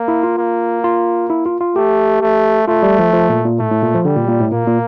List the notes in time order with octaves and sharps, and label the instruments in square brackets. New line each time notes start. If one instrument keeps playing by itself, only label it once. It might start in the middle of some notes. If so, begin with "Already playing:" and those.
Already playing: [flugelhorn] A#3
[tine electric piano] E4
F4
[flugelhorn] A#3
[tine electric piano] F4
E4
F4
F4
[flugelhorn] A3 [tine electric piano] G4
[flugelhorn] A3
[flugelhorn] A3 [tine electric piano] F4
[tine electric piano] G3
F3
F3
A#2
A#2
[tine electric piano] A2 [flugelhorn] A3
[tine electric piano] A2
A#2
F3
[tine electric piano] D3 [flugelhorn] G3
[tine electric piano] A#2
A#2
A2
[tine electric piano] A#2 [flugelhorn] A#3
[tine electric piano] A#2